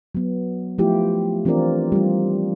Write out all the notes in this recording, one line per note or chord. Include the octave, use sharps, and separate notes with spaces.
F#3 B3
F3 A3 E4 F4 G4
E3 C4 D4 F4 A#4 D5
G3 F4